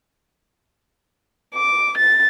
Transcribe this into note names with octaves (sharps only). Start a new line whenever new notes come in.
D6
A6